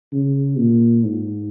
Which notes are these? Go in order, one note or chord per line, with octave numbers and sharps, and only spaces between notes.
C#3
A#2
G#2